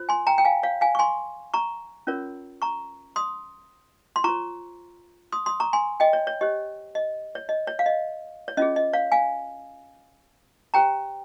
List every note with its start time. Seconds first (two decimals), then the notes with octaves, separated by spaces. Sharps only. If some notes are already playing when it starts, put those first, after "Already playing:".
Already playing: F4 C5
0.09 G#5 C6
0.27 G5 A#5
0.38 G5
0.45 F5 G#5
0.63 C#5 F5
0.81 F5 G#5
0.95 C#6
0.99 G#5 C6
1.54 A#5 C#6
2.07 C#4 F4 A#4 C#5
2.62 A#5 C#6
3.16 C6 D#6
4.16 C6
4.24 F4 C5 A#5 C#6
5.32 C6 D#6
5.46 C6 D#6
5.60 A#5 C#6
5.73 G#5 C6
6.00 D#5 G5
6.13 C#5
6.27 C#5
6.41 G4 C5 D#5
6.95 D#5
7.35 C#5
7.49 D#5
7.67 C#5
7.79 F5
7.86 D#5
8.48 C#5
8.57 C#4 F4 G#4 D#5
8.76 D#5
8.93 C#5 F5
9.12 F5 G#5
10.74 G4 C5 G5 A#5